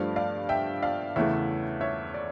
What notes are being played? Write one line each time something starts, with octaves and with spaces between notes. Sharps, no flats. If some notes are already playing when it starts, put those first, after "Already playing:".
Already playing: G2 F3 A3 D5 F5
D5 F5
E5 G5
D5 F5
E2 C#3 E3 A3 C#5 E5
C#5 E5
D5